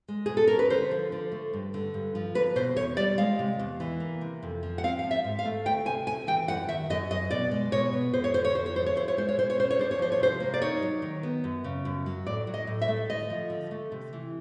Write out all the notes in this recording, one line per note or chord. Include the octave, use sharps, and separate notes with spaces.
G#3
B2 G#4
A4
C#4 A#4
B4
D3 C5
F3
D3
A3
G2
D3
G2
F3
A#3 B4
B2 C5
E2 C#5
G3 D5
G#3 F5
C3
E2
E3
A#3
C3
F2
F3
F#5
C4 F5
F5
F3
E5
G#2
F5
A3
D2 G5
C3 G#5
D2 G#5
E3 G5
F#2 F#5
D#3 E5
F#2 D#5
F#3 D#5
B2 D5
G#3
B2 C#5
B3
F2 C5
C#5
D3 C5
C#5
F2 C5
C#5
F3 C5
C#5
E4 C5
C#5
G#3 C5
C#5
B2 C5
C#5
C#4 C5
C#5
D4 C5
C#5
F3 C5
C#5
C3 C5
A#3
D5
D#4 C#5
F#3
D#3
B3
F#2
C#3
F#2
F#3
A2 D5
F#3
D#5
A2
E5
A3
D3 D#5
F3
D3
A3
C3
E3